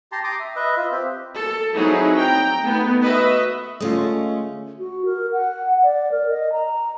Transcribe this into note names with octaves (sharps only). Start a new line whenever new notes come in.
G4 A5 A#5 C6
A#5 C6 D6 D#6
E5
B4 D#5 E5
F4 E5
C4 G4
A4
F#3 C4 D#4 E4 G#4
G5 A#5
A3 B3 D#4
F#4 B4 D#5 E5
D3 G#3 A3 C#4 F4 D#5
F#4
A#4
F#5
D5
A#4
D#5
A#5